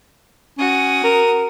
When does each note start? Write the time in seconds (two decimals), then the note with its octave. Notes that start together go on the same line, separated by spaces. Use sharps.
0.58 C#4 F#4 D#6
1.04 A#4